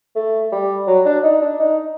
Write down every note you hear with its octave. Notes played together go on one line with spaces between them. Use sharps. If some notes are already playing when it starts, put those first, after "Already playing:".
A3
G3
F#3
D4
D#4
D4
D#4